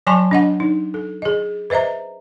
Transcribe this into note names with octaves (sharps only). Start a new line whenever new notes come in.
F#3 C#5 G#5 A5 C6 C#6
D4 D#5 F#5
D#4
A4
G#4 D#5
B4 C5 D#5 E5 A#5